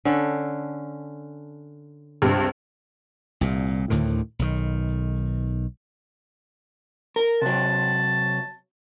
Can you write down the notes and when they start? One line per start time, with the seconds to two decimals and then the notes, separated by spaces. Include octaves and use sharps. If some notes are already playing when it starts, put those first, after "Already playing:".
0.05 D3 C#4 A4
2.22 C#2 G2 C3
3.41 C2 A#2
3.90 D2 A2 D3 D#3
4.39 B1 D#3
7.16 A#4
7.42 C3 F#3 A5